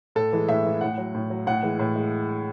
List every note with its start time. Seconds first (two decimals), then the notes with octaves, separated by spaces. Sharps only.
0.15 A2 A4
0.33 E3 G#3
0.49 A2 E5
0.65 E3 G#3
0.81 A2 F#5
0.98 F#3
1.14 A2
1.30 F#3
1.47 A2 F#5
1.63 E3 G#3
1.79 A2
1.95 G#3